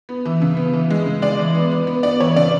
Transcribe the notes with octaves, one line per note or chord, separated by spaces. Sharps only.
B3
E3
C#3
B3
E3
G#3
C#3
G#3 D5
E3
B3
B3
B3
B3 D5
E3 C#5
C#3 D5